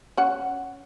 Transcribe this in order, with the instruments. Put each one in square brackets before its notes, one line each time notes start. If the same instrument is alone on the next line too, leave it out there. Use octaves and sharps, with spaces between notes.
[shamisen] C#4 F#5